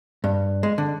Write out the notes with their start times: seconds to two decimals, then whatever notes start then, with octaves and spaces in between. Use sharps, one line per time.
0.24 G2
0.63 G#3
0.78 D3